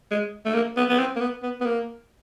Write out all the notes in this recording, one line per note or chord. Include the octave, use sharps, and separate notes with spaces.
G#3
A3
A#3
B3
B3
C4
A#3
B3
B3
B3
A#3